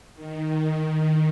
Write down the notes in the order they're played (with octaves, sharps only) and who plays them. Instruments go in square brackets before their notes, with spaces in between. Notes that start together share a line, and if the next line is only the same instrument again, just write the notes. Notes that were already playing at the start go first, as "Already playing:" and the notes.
[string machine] D#3